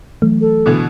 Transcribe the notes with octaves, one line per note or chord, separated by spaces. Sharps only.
E3 F#3 A3
A4
B2 D3 E3